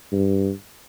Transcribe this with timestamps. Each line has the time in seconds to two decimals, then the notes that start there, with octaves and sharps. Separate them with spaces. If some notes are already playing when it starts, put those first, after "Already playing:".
0.12 G2